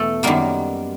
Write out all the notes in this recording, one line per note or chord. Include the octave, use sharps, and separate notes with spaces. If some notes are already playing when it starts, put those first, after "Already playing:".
Already playing: E2 B2 A3 A4
F#2 D#3 G3 A#3 B3 A#4